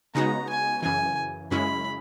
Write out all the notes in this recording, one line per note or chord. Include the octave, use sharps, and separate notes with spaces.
C#3 G#3 B3 D#4 F#4 A#5
G#5
F#2 C#3 E3 G#5
F#2 C#3 G#3 C#4 E4 B5